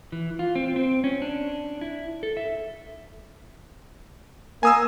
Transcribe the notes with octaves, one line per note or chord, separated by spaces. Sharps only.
E3
F4
C4
C4
C#4
D4
E4
A4
E5
A#3 G#5 D#6 E6